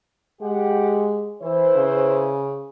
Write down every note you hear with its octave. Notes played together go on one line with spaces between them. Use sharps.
G#3 G4 F#5
E3 E4 B4 C5
C#3